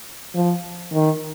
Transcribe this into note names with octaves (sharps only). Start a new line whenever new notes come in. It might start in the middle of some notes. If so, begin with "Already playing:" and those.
F3
D#3